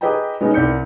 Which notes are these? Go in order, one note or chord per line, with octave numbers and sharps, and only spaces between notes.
G4 G#4 B4 D#5 G5 A#5
G#3 B3 C#4 D#4
C2 D5 G6 C#7